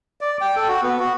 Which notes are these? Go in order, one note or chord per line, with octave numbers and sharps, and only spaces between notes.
D5
G5
A4
F#4
B3
F#4